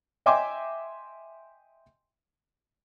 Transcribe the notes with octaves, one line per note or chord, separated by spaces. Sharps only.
D#5 E5 G5 G#5 C6 D6